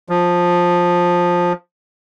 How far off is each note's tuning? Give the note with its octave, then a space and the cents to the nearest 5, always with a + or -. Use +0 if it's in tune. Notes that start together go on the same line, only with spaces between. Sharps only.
F3 +10